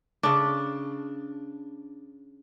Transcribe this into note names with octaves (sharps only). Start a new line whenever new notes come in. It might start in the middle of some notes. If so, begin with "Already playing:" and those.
C#3 D4